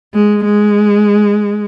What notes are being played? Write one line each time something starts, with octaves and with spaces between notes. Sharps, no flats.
G#3
G#3